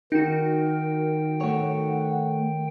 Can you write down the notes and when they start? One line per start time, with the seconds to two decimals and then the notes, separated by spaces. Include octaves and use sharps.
0.12 D#3 D#4 F#4 A#4 G5
1.41 A3 C#5 F#5